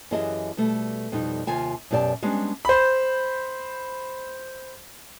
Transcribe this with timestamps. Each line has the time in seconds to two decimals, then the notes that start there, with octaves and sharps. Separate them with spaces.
0.11 F#2 E3 G4 G#4 D#5 A5
0.57 B2 G3 A3
1.12 F2 B2 G3 D#4
1.47 D#2 C3 D#3 F4 G#5 A5
1.91 F#2 B2 G4 D5 A5
2.22 G3 G#3 B3 C#4 D4 G4
2.65 C5 B5